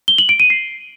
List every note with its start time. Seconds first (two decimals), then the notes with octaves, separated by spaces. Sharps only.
0.08 G7
0.18 F#7
0.29 D7
0.40 D#7
0.50 C7